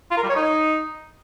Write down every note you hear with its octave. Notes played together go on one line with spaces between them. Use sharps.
F4
A#4
G3
C#5
D#4